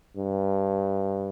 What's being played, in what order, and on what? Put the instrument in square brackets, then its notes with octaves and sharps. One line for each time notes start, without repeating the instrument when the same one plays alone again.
[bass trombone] G2